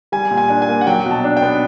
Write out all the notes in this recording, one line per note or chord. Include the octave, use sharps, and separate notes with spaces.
G3 G#5
A#2
G#5
D4
G#5
A#3
F#5
F#3 G5
B2
A5
D4
G5
B3